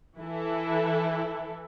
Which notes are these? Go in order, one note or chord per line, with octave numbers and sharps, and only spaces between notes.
E3 E4 A4